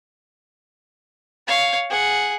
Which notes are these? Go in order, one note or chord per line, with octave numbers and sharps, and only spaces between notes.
C#5 F5
G#4 F#5